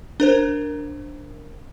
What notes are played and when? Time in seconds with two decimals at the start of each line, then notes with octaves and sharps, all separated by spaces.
0.20 D4 A#4 C5